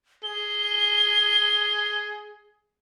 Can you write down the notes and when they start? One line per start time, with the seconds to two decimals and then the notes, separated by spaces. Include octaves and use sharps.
0.23 G#4 G7